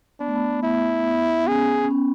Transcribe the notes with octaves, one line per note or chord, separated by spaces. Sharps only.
B3 D4
A3
B3
B3 E4
B3
C#4 G#4
C#4
B3